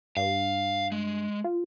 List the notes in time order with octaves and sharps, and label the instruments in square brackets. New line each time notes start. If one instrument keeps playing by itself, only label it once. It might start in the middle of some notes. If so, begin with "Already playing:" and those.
[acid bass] G2 [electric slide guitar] F5
[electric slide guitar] G#3
[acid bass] F4